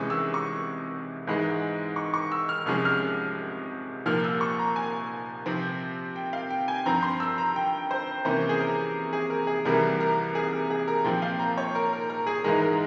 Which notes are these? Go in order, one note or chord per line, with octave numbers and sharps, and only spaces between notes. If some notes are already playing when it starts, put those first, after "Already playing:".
Already playing: C2 C3 E3 G#3 C#4 C#6
E6
C#6
G#2 E3 G#3
C#6
C#6
E6
F6
C2 C3 F3 G#3 C#4 F6
F6
C2 A#2 F3 A#3 F6
E6
C#6
A#5
G#5
C3 F3 C4
G5
F5
G5
G#5
G2 F3 C4 A#5
C6
E6
A#5
G5
C5
C3 E3 A#3 C#4 C5
G#4
A#4
G#4
A#4
G#4
C2 C3 E3 G3 A#3 A#4
A#4
G#4
A#4
G#4
A#4
A#2 F3 C4 G5
F5
A#5
C#5
A#4
A#4
A#4
G#4
G#2 E3 G#3 A#4
A#4